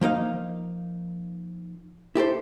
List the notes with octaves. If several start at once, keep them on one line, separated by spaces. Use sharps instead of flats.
F3 A#3 D#4 F5
E4 G4 A4 C5